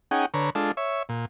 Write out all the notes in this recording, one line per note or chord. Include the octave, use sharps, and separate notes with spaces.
C#4 D#4 G#4 F#5 G5
D3 B4 C#5 A#5
G#3 D4 F4 A4
C#5 E5
A#2